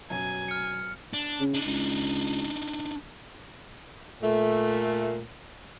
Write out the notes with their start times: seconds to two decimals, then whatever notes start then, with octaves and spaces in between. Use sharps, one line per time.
0.10 F#2 B2 F#3 G#5
0.48 F6 C#7
1.13 D4
1.40 C#3
1.54 D4 D#4
1.66 C#2
4.23 A#2 A3